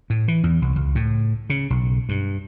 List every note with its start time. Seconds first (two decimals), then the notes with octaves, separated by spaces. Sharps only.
0.10 A2
0.28 E3
0.43 E2
0.62 C2
0.76 C#2
0.95 A2
1.50 C#3
1.70 B1
2.09 G2